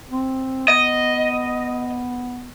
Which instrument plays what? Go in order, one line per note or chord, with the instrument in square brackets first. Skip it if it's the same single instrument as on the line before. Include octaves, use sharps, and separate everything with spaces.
[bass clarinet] C4
[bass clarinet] B3 [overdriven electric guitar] D#5